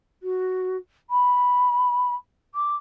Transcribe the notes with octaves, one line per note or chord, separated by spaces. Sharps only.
F#4
B5
D6